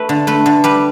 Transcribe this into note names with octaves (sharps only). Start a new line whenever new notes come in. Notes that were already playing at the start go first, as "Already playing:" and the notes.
Already playing: A3 B4
D3
A3 B4
D3
G3 B4